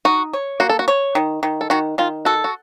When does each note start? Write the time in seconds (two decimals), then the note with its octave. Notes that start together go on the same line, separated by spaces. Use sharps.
0.05 D#4 F#4
0.33 C#5
0.60 A#3 F#4
0.69 A4
0.79 F#4
0.88 C#5
1.15 D#3
1.43 D#3
1.61 A4
1.70 D#3 F#4
1.98 D#3 F4
2.25 F#4 A4
2.44 F#4